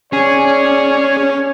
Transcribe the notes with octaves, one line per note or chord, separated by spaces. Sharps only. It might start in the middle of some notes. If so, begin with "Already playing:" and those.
C#4 G#4 C#5 D5